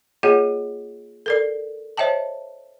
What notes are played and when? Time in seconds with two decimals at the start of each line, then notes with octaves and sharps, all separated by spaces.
0.23 A#3 F4 G#4 C#5 D#5 F#5
1.26 A4 A#4 D5
1.97 C5 C#5 D#5 E5 G5 A5